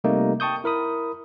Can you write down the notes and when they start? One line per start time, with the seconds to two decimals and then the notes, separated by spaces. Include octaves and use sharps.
0.04 C3 G3 A3 A#3 D#4
0.40 G5 A5 C#6 D#6 G6
0.64 E4 A#4 B5 D#6